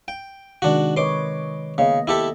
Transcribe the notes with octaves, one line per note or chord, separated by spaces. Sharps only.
G5
C3 D#3 G#3 D4 F#4
B4 C#5 D#5 C6 D6
C#3 A#3 B3 D#5
E4 G4 A4